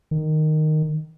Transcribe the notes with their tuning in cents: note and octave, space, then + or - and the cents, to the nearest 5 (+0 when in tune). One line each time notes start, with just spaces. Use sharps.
D#3 -10